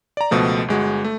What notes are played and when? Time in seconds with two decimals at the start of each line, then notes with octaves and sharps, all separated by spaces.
0.17 D5 A#5
0.31 C#2 B2 F3 A3
0.68 G1 G#3 F#4
1.04 A3